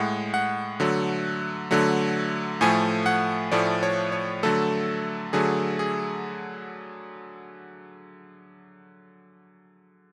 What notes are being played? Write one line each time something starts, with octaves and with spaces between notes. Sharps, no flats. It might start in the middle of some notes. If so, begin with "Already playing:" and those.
Already playing: A2 G#3 F#5
F#5
D3 F#3 A3
D3 F#3 A3
A2 F3 A3 G#5
F#5
A2 F3 A3 D5
C#5
C#5
D3 F#3 A3 A4
D3 F#3 A3 G#4
G#4